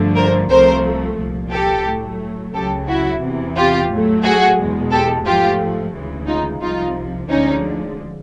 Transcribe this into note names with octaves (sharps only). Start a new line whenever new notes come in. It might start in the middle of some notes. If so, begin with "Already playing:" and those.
Already playing: G2 D3 F3 A3
A#4 C5
C2 C3 F3 A3 A#4 C5
C2 A#2 F3
G4 A4
A2 F#3 A3
C#2 C#3 F#3 G4 A4
E4 F#4
E2 C3 E3
F4 G4
A2 F#3 A3
F#4 G#4
E2 B2 G#3
G4 A4
G#2 F3 A3 F4 G4
D2 C#3 E3 G#3
D#4 F4
C2 C3 F3 D#4 F4
D2 D3 F3 G#3 C#4 D#4